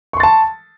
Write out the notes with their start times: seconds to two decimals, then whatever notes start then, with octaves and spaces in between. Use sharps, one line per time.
0.13 C#6
0.17 C6
0.20 A6
0.23 A5